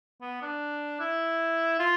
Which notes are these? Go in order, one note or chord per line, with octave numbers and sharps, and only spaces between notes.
B3
D4
E4
F4